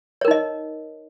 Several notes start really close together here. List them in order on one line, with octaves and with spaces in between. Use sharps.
C#5 A#4 D#4 D#5